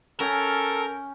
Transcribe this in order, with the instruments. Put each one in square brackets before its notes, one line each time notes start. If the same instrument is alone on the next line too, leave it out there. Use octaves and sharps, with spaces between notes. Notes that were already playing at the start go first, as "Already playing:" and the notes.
[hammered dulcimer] C#4 G5 [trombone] A4 [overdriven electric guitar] A#4